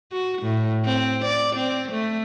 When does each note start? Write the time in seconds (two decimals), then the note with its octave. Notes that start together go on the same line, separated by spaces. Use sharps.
0.12 F#4
0.42 A2
0.85 C4
1.24 D5
1.56 C4
1.92 A3